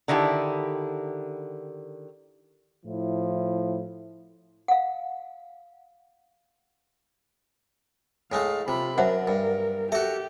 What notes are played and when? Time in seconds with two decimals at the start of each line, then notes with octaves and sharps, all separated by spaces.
0.08 D3 D#3 E4 G4
2.85 A2 F3 E4
4.68 F5 F#5
8.32 A2 G#3 A3 F5
8.68 C3 F4 B5
8.98 F#2 A#4 C5 E5 F#5
9.27 G2
9.92 F#4 G4 A4 E5